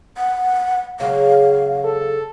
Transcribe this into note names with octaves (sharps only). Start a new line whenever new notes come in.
F#5
C#3 F#3 G#3 F5
A4